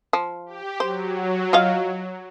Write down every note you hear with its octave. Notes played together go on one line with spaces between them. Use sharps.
F3
G4
F#3 C5
F4 D#5 F5